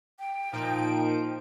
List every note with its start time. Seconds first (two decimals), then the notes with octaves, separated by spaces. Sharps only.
0.20 G5
0.53 A#2 F3 D#4 D7